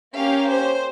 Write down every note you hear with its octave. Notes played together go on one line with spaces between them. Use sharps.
A#3 C#4 G4 F5
C5